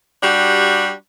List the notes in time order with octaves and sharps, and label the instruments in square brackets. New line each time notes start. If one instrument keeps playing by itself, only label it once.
[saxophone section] G3 D4 F#4 G4